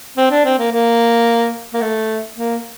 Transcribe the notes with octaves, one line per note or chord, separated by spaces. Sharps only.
C4
D4
C4
A#3
A#3
A#3
A3
A#3